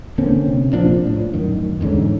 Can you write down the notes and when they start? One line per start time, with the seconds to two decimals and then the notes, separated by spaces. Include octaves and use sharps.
0.18 D3 A#3 C4 C#4
0.48 C3
0.73 A#1 A#2 F3 D4
1.07 A2
1.33 F#2 D#3
1.81 E2 G#2 D3 C#4